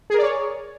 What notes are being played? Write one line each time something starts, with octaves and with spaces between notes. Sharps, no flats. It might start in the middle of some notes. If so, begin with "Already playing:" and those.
G#4 A#4 C#5 D5